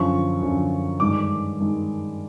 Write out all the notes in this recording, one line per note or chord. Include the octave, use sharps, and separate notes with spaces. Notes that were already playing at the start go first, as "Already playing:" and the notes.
Already playing: F#2 D3 F3 C#6
F#2 D3 F3
G2 D#3 G#3 D6
D#3 G#3